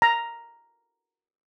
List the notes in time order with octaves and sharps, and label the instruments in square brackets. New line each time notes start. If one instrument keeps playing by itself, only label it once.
[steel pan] A#5